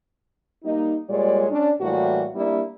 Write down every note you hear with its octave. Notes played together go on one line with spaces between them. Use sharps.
G3 A#3 D#4
A#2 G3 G#3 C#5 D5
C#4 D4
A2 E3 G3 A#3 F#4
G3 A#3 D4 E4